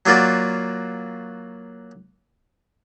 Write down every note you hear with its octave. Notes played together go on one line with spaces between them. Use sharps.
F#3 A#3 F4 F#4 D5